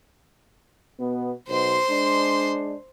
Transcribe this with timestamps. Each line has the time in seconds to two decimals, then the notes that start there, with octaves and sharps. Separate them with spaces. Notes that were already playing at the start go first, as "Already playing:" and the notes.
0.98 B2 B3
1.48 B1 B2 C5 C6
1.89 G#3 D4